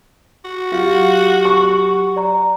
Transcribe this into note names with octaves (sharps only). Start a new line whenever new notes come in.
F#4
F#3 F4 G4 F#5
C#6
D5 A#5